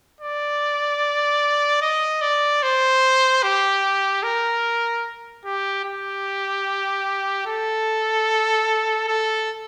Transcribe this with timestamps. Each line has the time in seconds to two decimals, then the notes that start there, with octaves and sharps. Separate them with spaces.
0.21 D5
1.82 D#5
2.22 D5
2.63 C5
3.43 G4
4.23 A#4
5.45 G4
5.85 G4
7.46 A4
9.08 A4